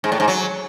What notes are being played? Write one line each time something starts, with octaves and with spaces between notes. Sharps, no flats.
G#2
A2
G#2
F#3